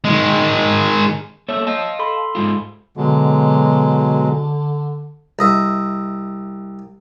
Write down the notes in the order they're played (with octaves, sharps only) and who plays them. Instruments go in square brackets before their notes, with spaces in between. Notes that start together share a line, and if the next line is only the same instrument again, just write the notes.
[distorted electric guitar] D#3 G#3
[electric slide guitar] A#3 A4 E5 [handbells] C#5 E6
[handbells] D#5 [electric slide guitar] F5 A5
[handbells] A4 B5 C6
[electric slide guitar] G#2 G#3 F4
[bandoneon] B2 F#3 G#3 [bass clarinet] D3
[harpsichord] C2 D#5 E5